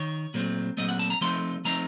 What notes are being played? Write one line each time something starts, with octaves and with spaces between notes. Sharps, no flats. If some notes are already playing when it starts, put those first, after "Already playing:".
Already playing: D#3 C#5
A#2 F#3 A3 C4
A#2 F#3 A3 C4 D#5
F#5
A5
A#5
F3 A3 C4 D#4 C6
F3 A3 C4 D#4 A#5